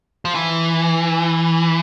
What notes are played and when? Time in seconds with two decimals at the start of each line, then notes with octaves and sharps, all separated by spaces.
0.25 F3
0.35 E3